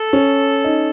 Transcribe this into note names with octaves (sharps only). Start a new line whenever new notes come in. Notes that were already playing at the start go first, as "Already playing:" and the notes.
Already playing: A4
C#4
D#4